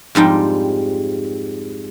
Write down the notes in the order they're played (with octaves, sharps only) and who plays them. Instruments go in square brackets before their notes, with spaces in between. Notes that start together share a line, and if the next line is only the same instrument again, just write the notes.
[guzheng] F2 G#2 G3 G5